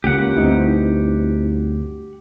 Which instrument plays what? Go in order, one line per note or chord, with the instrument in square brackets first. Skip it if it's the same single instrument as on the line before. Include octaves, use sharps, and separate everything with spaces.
[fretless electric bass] C#2 A#3 [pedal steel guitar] G4 F#5
[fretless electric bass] D2 G2 [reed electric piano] C4 D#4 E4